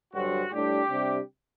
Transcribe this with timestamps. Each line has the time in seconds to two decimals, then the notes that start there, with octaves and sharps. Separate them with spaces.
0.13 G2 D3 F#3 C4 F#4
0.52 A2 G3 D4 G4
0.89 C3 G3 D4